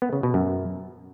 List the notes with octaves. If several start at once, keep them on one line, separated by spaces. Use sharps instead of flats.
B3
C#3
B2
F#2